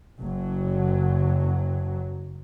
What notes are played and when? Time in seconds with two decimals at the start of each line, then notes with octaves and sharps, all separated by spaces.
0.21 F#1 F#3